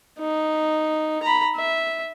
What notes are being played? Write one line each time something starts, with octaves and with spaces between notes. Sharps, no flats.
D#4
A#5 B5
E5